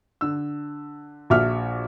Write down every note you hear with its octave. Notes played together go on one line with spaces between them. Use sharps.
D3 E6
A#1 F#4 E5 D6 F6